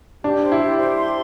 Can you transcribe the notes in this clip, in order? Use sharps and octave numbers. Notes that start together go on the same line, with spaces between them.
D4 G4
C5
E4
G4
C5
C6